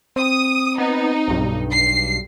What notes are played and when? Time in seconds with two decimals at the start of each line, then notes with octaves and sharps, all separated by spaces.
0.16 C4 D#6
0.78 B3 D#4
1.27 B1 G2
1.72 C7